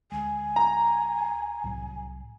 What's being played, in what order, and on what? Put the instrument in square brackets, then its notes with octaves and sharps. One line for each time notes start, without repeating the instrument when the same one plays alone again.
[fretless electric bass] D2 G#3 [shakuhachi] G#5
[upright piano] A#5
[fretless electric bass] C2 A2 F#3